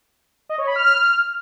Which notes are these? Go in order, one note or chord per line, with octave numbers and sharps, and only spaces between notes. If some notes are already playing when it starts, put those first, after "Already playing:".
D#5
C#5
B5
F6